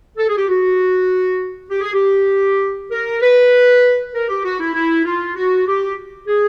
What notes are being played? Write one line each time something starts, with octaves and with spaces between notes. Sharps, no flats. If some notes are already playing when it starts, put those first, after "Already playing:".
A4
G#4
G4
F#4
G4
G#4
G4
A#4
B4
A#4
G4
F#4
E4
E4
F4
F#4
G4
G#4